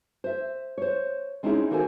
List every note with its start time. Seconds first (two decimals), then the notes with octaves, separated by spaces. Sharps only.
0.24 C5 E5
0.78 C5 C#5
1.43 G#3 C4 C#4 D#4 E4 G#4
1.71 D#3 A#3 F#4 A4 C5 G#5